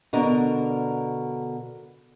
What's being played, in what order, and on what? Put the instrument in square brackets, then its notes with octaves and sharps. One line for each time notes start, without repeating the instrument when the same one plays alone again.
[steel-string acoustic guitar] B2 D3 A#4